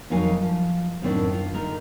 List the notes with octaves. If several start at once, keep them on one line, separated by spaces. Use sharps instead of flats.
F2 D#3 F#3 D#4 F5 G#5
F3
F#2 A2 D#3 C4 D4
F4
D3 D#4 A#4